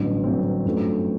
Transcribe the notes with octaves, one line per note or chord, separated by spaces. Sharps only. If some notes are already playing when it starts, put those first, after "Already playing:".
Already playing: A1 G2 D3 F#3
A1 G2 D3 F#3 C4
G1 F#2 F#3 A3